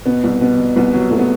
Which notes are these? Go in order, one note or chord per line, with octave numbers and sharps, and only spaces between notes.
B2 B3
C2
B2 B3
B2
C2 B3
F#3
C2 A3
B3